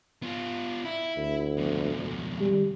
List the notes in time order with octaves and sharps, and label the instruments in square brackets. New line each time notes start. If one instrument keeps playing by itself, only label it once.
[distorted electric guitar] B3 F4
E4
[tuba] D2
[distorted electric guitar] F2 B2
[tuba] G3